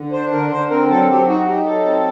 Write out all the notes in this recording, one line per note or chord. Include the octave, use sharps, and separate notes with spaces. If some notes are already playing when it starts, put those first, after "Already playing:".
Already playing: D3
D4 C5
D3 A#4
D3 C5
C4 A#4
F#3 A4
F#3 G4
D#4 F#4
D#4 G4
F#3 A4
C4